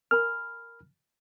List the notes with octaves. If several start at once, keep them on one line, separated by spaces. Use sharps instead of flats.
A#4 G#5 B5 F6